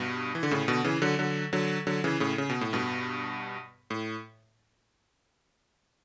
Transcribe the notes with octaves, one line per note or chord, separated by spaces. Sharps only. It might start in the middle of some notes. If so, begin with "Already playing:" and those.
Already playing: G2 B2
E3
D3
A2 C#3
B2 D3
C#3 E3
D3 F#3
D3 F#3
D3 F#3
D3 F#3
C#3 E3
A2 C#3
C#3
B2
A2
G2 B2
A2